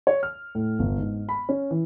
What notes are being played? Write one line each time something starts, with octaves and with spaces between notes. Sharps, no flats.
C#5
F6
A2
G1
G#2
B5
C#4
E3